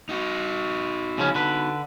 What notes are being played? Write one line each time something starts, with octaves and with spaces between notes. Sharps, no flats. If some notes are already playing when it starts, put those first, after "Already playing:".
D#4 F#4
C#3 F3 C#4
D3 B4